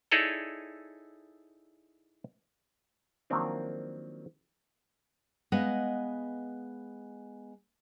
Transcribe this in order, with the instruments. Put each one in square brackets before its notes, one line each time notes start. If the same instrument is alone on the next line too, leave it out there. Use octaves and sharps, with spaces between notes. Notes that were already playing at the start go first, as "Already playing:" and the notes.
[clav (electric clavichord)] D#4 E4 G#4 A4 C#5 D5
D#3 F3 F#3 A#3 C4 D4
[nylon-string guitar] G#3 B3 D#5 F5 F#5